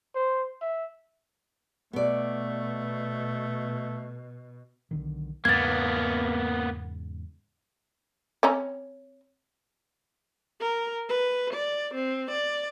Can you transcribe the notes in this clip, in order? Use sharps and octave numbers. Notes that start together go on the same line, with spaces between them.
C5
E5
B2 A3 B3 D5
B1 D3 D#3
E2 G#2 C#3 A#3 B3 G#6 A6
C4 C#4 A#5
A#4
B4
D5
C4
D5